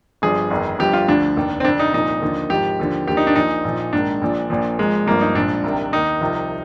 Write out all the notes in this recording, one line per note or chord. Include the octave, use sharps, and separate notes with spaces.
G1 G2 F3 G#4
G1 F2 D#3
G1 G2 F3 G4
F4
D2 D3 F3 D4
F1 D#2 D#3
C4
F1 F2 D3 D4
D#4
C2 A#2 F3 D#4
D#2 D3 F3
G#1 G#2 F3 G4
D#2 D3 F3
D#2 D3 F3 G4
D#4
D4
A#1 A#2 F3 D#4
A#1 A#2 F3
A#1 G#2 D#3 D4
A#1 A#2 F3
A#1 A#2 F3
G#1 G#2 F3 G#3
G1 G2 F3 A#3
D#4
A#1 G#2 F3 D4
C2 C3 D#3
D#2 D#3 D#4
C2 C3 F3